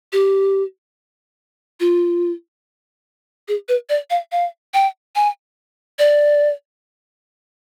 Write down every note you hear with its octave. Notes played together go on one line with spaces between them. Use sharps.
G4
F4
G#4
B4
D5
F5
F5
G5
G#5
D5